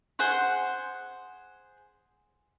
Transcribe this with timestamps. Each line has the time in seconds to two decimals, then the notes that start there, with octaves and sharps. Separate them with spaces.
0.19 G#4 C5 F#5 C6